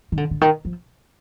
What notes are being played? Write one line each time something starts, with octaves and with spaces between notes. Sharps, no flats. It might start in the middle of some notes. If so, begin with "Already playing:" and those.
D#3
D3
D3
D#3
F3